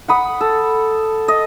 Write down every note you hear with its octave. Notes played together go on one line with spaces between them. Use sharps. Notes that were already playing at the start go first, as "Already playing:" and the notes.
F#5 B5 D#6
A4
D#5